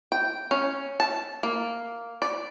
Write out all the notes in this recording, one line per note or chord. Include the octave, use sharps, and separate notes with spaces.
G5
C#4
A5
A#3
D5